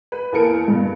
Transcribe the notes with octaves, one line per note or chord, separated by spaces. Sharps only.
B4
E2 A#3 A4 A#4 C#7 D7
G2